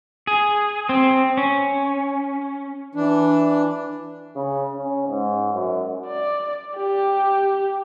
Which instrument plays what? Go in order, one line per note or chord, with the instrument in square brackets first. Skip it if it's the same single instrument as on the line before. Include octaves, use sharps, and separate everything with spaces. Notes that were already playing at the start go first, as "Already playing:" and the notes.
[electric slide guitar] G#4
C4
C#4
[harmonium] E3 D4
[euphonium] C#3
C#4
G#2
F#2
[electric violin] D5
G4